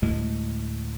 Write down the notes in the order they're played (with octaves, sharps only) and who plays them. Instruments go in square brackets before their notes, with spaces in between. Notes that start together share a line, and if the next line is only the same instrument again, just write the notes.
[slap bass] D2 A2 G#3